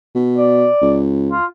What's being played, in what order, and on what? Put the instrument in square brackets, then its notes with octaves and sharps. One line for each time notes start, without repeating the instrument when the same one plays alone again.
[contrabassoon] B2
[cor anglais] D5
[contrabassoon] C#2
[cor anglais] F4